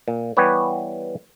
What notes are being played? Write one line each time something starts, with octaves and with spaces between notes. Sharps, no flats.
A#2
E3 G3 B3 G4 B4 C#5